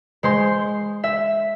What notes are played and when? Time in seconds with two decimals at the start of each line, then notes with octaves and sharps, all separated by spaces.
0.23 G#3 C5 C6
1.04 E5